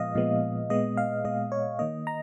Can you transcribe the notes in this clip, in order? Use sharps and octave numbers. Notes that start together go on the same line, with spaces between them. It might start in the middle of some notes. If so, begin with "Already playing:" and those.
Already playing: A#2 F3 G#3 B3 D#5 F5
A#2 F3 G#3 B3
A#2 G#3 B3 D#5
F5
A#2 G#3 B3 D#5
C#5
D#3 A#3 D#5
A#5